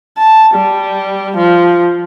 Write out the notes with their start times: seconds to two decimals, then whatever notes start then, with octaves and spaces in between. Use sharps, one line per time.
0.18 A5
0.55 G3
1.37 F3